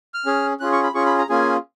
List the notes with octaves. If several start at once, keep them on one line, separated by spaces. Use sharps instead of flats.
F6
C#4 G#4
C#4 F4 G#4 F#6
C#6
B5
C#4 F4 G#4 C#6
B5
A#5
A#3 C#4 F4 G#4 G#5